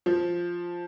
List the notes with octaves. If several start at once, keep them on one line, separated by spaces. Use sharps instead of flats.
F3